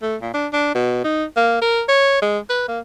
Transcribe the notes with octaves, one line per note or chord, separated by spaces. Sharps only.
A3
A#2
D4
D4
B2
D#4
A#3
A#4
C#5
G#3
B4
A#3